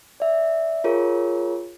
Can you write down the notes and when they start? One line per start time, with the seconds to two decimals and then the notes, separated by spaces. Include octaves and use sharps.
0.20 D5 E5
0.84 F4 G#4 A#4 C#5